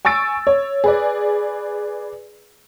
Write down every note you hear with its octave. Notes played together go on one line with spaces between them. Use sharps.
G#5 C#6 E6 A6 D7
C#5
G#4 B4 D5